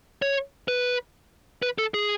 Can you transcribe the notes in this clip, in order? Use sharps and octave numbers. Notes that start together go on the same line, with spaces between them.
C#5
B4
B4
A4
G#4